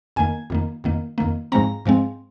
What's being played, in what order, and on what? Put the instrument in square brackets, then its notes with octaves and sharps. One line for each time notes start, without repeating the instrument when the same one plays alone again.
[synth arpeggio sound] F2 D#3 A#3 G#5
F2 D#3 A#3
F2 D#3 A#3
F2 D#3 A#3
G#2 F3 G#3 C4 A#5
G#2 F3 G#3 C4